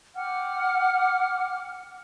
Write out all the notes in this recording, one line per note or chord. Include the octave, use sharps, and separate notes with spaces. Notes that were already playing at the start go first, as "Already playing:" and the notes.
F#5 G5 D6 F6